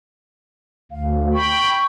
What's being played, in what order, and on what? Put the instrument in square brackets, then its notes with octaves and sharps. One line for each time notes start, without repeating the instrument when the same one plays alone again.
[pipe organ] D2 [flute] F5
[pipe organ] G5 B5 [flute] C#6